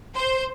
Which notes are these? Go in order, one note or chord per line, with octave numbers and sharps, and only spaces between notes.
C5